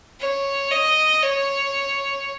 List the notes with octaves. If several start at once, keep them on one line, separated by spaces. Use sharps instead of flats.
C#5
D#5
C#5